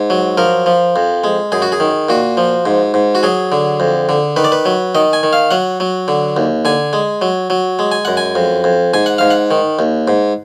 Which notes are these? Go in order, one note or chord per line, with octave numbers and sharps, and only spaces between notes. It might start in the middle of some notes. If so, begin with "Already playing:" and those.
Already playing: G#2
F#3
F3 A#4
F3
F2
G#3
F#2 G#4
F#4
G#4
D#3
A#2 F#4
F3
G#2
G#2
F#4
F#3 G#4
D3
F2
D3
D#3 B4
D5
B4
F#3
D#3 D#5
G#5
D#3
F5
F#3 F#5
F#3
D3
D#2
D3 G#5
G#3
F#3
F#3
G#3
G#5
F#2 F#5
G#5
F2
F2
G#2 G#5
F#5
G#2 F5
F#5
D#3
D#2
G#2